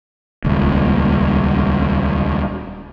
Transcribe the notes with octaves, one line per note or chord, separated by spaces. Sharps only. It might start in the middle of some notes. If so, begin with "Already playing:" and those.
D#1 C#2